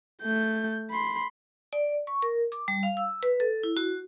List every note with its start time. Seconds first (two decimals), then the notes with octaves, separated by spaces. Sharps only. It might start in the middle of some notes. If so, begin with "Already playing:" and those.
0.22 A3 G6
0.91 B5 C6
1.73 D5
2.07 C#6
2.22 A#4
2.52 D6
2.68 G3
2.83 F5
2.97 E6
3.23 B4
3.40 A4
3.63 E4
3.77 F#4